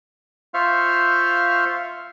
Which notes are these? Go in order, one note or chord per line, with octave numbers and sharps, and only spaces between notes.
F4 C5 E5 F5 C#6 F6